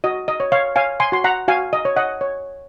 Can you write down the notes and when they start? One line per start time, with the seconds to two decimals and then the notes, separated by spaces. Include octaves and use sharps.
0.04 F#4 D#5
0.28 D#5
0.40 C#5
0.52 C#5 F5
0.76 C#5 F5 G#5
1.00 G#5 C6
1.12 F#4 C6
1.24 F#5 A#5
1.48 F#4 F5 G#5
1.73 D#5
1.85 C#5
1.96 D#5 F#5
2.21 C#5